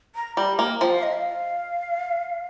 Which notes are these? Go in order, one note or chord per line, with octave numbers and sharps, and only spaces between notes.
A#5
G3 A#5
A#3 G5
F3 G5
F5
D#5
F5